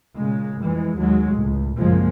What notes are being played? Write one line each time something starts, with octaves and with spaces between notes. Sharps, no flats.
A#2 C#3 G#3
F2 E3 G#3
D#2 F#3 G#3
C#2 A2
A#1 F#2 C#3 F3 G#3 A#3